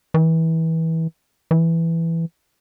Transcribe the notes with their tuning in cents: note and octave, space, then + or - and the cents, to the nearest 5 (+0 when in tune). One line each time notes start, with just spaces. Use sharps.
E3 -25
E3 +5